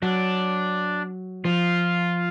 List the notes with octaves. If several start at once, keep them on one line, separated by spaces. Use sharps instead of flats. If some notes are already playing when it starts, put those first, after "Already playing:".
F#3 D4
F3 F4